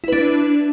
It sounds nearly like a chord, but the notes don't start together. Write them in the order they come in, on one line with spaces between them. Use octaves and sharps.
E4 B4 D4